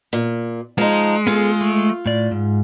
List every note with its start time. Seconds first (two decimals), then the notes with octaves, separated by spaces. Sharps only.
0.13 A#2
0.78 F3 G#3 D#4
1.27 B3 F4 G#4 A4
1.61 A3
2.06 A2 D5
2.31 G#2